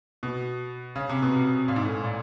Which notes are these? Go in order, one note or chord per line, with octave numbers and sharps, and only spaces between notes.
B2
C#3
C3
B2
C3
A#2
G#2
A2
A#2